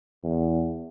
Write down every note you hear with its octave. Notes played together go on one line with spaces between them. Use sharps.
E2